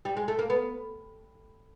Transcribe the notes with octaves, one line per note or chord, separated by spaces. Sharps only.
G3
G#3
A3
A#3
B3